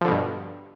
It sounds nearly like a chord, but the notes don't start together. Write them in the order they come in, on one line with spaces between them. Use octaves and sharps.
F3 D3 B2 G2